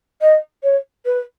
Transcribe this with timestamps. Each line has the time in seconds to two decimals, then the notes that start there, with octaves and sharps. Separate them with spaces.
0.21 D#5
0.63 C#5
1.05 B4